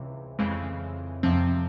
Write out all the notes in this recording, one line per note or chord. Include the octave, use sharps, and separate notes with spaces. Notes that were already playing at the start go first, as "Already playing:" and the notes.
Already playing: C#2 C3 E3
F2 C#3 E3 G#3 C4
F2 C3 F3 C4